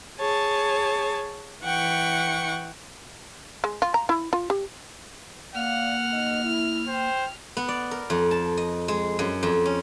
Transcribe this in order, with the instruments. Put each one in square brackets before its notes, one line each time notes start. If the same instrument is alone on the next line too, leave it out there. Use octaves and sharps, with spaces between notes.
[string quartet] G#4 C#5 A5
E3 F#5 G5 C#6
[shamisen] G#3
F4
A#5
E4
F4
G4
[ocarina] A#3 [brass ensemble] D5 F5 [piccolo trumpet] F#5 [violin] F6
[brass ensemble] B1 D#4 D#5
E4
[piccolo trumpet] C5 [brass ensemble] G5
[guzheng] B3
D5
A#4
F2
A5
D#5
G#3
F#2
F2
C#4